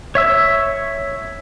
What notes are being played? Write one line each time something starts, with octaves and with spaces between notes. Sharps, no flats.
C#5 E5 E6